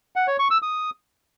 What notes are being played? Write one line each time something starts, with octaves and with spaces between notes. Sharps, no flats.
F#5
C#5
C#6
E6
D#6